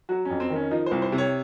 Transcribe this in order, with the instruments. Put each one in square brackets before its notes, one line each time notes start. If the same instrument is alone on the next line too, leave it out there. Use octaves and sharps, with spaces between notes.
[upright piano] F#3 F#4
F2 C#4
C4
D#3
C#4
F3 D#4
C2 C5
C5
C3
C#5